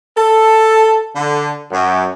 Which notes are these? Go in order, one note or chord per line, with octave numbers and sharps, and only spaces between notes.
A4
D3
F#2